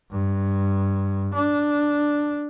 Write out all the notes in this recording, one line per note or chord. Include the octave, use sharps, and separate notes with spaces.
G2
D4